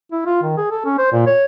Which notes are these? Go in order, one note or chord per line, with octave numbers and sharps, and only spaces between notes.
E4
F4
D#3
G#4
A4
C#4
C5
A#2
C#5